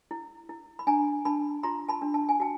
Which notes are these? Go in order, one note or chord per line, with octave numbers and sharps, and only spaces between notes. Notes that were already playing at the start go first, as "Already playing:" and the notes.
E4
E4
B5
D4 G#5 A#5
D4 A5 B5
F4 A#5 C6
A5 B5
D4
A5
G#5
F#4 G5 A5